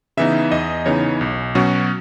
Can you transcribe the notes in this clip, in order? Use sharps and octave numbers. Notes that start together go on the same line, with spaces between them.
C#3 E3 B3 D#4 E5
E2 D#5
C#3 E3 B3 D#4 C#5
B1
B2 F#3 C#4 F#4